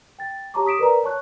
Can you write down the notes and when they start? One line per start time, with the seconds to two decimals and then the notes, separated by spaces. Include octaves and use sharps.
0.19 G5 A6
0.54 G4 C#5 A5 A#5 C#6 D6
0.66 D#6 B6 D7 E7
0.79 A#4 B4 D5 A#5
1.03 C#5 A5 C#6 F#6